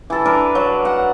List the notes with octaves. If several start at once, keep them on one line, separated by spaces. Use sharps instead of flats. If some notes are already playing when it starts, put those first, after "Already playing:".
E3 A4
D4 A#4 B4
F#3
F#5